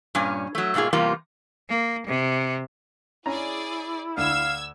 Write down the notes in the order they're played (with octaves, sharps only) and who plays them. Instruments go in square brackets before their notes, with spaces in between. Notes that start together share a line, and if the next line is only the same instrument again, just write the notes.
[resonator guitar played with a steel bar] G2 A#2 C#4 G#5
F#3 A3
G#2 B2 A#3 F4 G#4
E2 C3 G3 A#3 F4
[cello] A#3
C3
[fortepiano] C#4 A#5 [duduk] E4 [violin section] G#4 D5
[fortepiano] D2 [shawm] F5 [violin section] E6 G#6